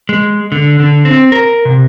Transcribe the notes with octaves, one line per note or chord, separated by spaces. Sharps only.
G#3
D3
D3
C4
A#4
C3